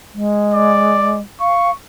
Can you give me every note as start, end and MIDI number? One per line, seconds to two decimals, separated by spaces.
0.14 1.21 56
0.54 1.16 74
1.41 1.71 77
1.41 1.74 85